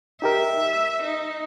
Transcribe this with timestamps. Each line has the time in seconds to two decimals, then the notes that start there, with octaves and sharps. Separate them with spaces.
0.22 D#4 G4 A#4 E5
0.73 E6
1.02 D#4